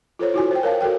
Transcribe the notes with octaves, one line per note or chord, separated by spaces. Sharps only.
F4 A4 C5 C#5
E4 F#4 G#5
C5 G5
A#4 C#5 F5 A5
F#4 A4 A#4 G5